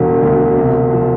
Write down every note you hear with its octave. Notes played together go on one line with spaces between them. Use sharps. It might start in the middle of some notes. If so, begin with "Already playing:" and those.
Already playing: E1 D3 G3
D2
C3
F3